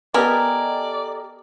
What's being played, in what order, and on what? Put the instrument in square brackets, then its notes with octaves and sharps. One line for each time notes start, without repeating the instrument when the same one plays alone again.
[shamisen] B3 [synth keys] G4 A4 D#5 [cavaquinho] A#4 G#5 [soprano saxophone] D5